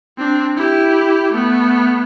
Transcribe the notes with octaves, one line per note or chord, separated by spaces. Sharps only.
C4 D4
E4 G4
A3 B3